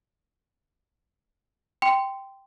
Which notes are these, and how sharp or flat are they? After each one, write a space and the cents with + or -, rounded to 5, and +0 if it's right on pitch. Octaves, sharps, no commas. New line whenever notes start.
G5 +0 C6 -15